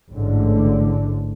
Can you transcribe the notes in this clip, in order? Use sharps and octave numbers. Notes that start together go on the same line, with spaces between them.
A1 G#2 D3